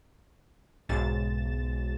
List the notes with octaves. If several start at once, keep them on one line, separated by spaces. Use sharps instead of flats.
B1 G#2 A6 E7